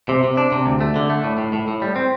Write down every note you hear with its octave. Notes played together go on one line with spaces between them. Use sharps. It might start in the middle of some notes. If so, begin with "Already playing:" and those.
C3
C3
D4
C3
D2
A3
D3
A3
A2
A2
A2
A2
G3
C4